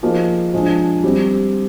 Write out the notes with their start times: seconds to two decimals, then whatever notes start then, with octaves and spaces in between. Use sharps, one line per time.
0.03 F3 A#3 D#4 G#4
0.54 F3 G#3 D4
1.04 G3 C4 G4